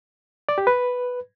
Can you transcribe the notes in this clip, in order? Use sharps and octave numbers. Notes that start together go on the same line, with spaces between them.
D5
G4
B4